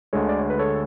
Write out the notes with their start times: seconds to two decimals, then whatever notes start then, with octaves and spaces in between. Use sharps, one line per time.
0.13 D2 D3 G#3 A4 C#5
0.29 D5
0.39 C#5
0.50 B4
0.59 A4 C#5